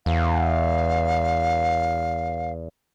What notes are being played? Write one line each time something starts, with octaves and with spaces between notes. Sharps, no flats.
E2 F5